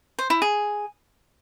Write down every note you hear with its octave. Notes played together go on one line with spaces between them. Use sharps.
C5
E4
G#4